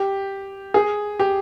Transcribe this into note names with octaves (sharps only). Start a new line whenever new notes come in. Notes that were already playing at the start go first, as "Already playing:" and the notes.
Already playing: G4
G#4
G4